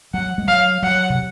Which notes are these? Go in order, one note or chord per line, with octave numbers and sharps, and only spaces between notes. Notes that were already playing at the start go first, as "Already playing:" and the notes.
F#3 F#5
G#3
F#3 F5
F#3 F#5
C3